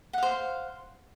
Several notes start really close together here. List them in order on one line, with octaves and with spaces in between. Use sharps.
F#5 F5 C5